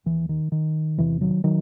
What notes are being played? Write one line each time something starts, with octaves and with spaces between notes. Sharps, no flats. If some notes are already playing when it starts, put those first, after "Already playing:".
D#2 E3
D#3
D#3
E2 C3 E3
D#3 F#3
D#3 F#3